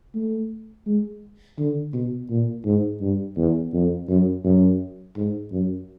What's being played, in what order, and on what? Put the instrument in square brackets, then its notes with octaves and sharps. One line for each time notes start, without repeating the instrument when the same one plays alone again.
[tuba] A3
G#3
D3
B2
A#2
G#2
G2
E2
F2
F#2
F#2
G#2
F#2